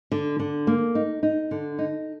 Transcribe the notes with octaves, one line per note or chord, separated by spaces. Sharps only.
D3
D3
A#3
D#4
D#4
D3
D#4